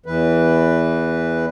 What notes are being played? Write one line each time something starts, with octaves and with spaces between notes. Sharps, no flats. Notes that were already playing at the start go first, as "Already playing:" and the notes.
E2 E3 B4